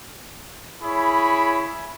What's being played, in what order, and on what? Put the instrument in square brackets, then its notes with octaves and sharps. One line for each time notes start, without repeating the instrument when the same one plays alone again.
[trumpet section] E4 G#4 C#5 B5